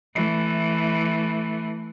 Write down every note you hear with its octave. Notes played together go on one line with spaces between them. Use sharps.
E3 A3